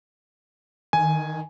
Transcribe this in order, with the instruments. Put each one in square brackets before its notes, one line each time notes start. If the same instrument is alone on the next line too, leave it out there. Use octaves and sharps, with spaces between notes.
[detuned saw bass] D#3 [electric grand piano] G#5